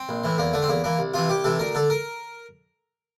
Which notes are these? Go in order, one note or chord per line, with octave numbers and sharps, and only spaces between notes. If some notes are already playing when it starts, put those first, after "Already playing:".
Already playing: C4
A#1
A2 E3
E2 A#3
D3 A3
C4
E2 A#3
E3 A#3
C2
C3 E3 F4
C2 G4
C3 E3 A4
D2 A#4
D3 A4
A#4